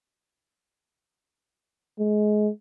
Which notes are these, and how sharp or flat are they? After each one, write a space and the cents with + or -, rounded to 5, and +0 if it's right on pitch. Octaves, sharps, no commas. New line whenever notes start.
G#3 +25